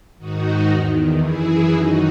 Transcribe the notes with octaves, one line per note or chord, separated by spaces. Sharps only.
G#2 D#3 D#4 F#4
E2 D#3
F#2 E3 E4 G#4
F#2 D#3 D#4 F#4